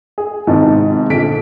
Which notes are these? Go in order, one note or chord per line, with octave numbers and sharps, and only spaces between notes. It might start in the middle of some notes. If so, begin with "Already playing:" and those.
G#4
G#1 G#2 C3 D#3 B3 A5
A#1 A#2 D3 G#4 B6 D7